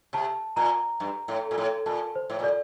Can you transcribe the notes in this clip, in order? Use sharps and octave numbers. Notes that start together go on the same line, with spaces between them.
C3 A5
A#2 A#5
G2
A2
A#2
A2
A#2 A5
C5
A2
A#2
D5